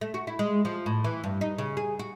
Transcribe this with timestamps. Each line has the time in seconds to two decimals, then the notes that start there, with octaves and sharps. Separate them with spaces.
0.01 A3
0.14 F#4
0.27 E4
0.39 G#3
0.65 F3
0.86 A2
1.04 E3
1.24 G2
1.41 D#4
1.58 C#3
1.77 G#4
1.99 F#4